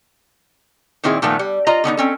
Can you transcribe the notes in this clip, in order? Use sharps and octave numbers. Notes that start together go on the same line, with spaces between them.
A#2 D#3 C4 E4 G#4
A#2 D#3 F3 A3 B3
G3
F4 D#5 A#5
D3 B3 C#4 D#4
C4 C#4 A4